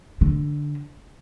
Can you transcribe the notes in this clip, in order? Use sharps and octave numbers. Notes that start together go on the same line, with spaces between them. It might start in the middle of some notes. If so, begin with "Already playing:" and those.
D3